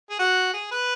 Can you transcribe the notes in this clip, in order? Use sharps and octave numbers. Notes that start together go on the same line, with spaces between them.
G#4
F#4
G#4
B4